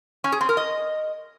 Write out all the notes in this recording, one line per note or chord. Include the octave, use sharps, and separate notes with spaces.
C#4
G#4
C4
A#4
D#5